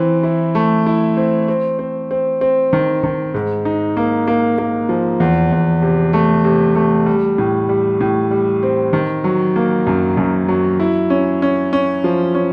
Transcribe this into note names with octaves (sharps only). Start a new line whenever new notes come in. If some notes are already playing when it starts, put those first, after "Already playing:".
Already playing: E3 C4
E4
A3
E4
C4
C4
C4
C4
C4
D#3
D#3
G#2
D#4
A#3
A#3
A#3
F3
E2
E2
C3
A3
C3
A3
G3
A2
G3
A2
G3
C4
D#3
F#3
A#3
F#2
F#2
F#3
E4
C#4
C#4
C#4
F3
C#4